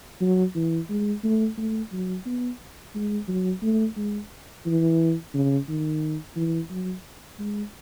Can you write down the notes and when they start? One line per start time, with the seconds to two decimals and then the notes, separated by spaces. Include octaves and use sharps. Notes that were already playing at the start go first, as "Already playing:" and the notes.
0.21 F#3
0.55 E3
0.89 G#3
1.24 A3
1.58 A3
1.92 F#3
2.26 B3
2.95 G#3
3.28 F#3
3.62 A3
3.96 G#3
4.66 E3
5.34 C#3
5.68 D#3
6.36 E3
6.70 F#3
7.39 G#3